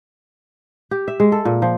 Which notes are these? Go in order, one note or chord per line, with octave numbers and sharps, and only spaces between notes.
G4
E5
G#3
A4
A#2
F3